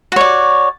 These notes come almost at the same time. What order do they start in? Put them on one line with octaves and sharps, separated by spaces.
F#4 C#5 D5